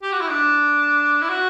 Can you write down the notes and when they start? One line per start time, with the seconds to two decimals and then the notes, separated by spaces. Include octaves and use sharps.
0.03 G4
0.12 F#4
0.21 E4
0.30 D4
1.22 E4
1.29 F#4